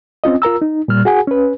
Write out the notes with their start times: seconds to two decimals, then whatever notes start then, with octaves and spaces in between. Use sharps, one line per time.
0.24 C4 C#4 F4 D#5
0.42 F4 A#4 A#5 E6
0.62 D#4
0.88 A#2 G3 F6
1.05 F#4 G#4 F#5 G#5
1.28 C#4 B4